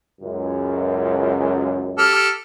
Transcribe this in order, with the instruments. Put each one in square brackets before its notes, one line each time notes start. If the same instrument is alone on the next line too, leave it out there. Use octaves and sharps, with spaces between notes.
[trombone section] C#2 F#2
[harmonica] G4 A4 F6